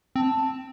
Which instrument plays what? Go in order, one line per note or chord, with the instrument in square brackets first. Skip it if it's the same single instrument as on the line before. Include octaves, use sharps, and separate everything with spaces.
[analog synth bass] C4 [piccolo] A5